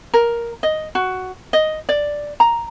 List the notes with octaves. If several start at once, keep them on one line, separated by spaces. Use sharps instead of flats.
A#4
D#5
F#4
D#5
D5
A#5